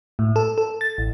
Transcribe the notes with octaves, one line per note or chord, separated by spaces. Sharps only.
A2
A4
A4
A6
A1